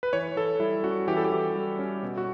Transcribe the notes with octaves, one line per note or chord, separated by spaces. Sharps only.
B4
E3 C#5
E3 A4
G3 E4
C#4 F#4
E3 G4
A4
G4
E3
G3
C#4
B2
F#4